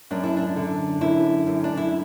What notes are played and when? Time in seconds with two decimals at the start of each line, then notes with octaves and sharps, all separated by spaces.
0.11 F#2 D4
0.24 E4
0.37 D4
0.56 D3
1.01 F#2 E4
1.47 F#2
1.64 D4
1.77 E4